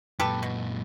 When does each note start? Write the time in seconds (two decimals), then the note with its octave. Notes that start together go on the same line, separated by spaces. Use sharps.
0.20 F#2 A#2 G4 A4 B4
0.43 B2